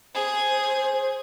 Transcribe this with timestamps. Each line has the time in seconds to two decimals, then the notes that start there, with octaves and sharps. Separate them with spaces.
0.15 G#4 C5